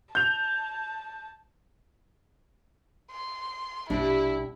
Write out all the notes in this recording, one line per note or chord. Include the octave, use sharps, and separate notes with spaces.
A5 G6 F7
C6
A#1 B2 G3 D4 E4 G4